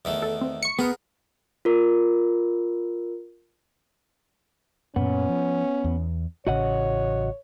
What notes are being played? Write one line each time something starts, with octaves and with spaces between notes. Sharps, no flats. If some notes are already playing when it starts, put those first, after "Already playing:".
E2 D#3 A3
A4
C4
C#6 C#7
B3 G#4 A#4
F4 A#4
F#2 A#2 B3 C#4
F3
E2
A1 C#3 F#4 C#5 D#5 F#5